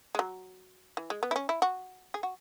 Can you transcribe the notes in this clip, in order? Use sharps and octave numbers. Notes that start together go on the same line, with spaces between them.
G#3
F#3
E3
G#3
B3
E4
C#4
E4
F#4
G#4
F#4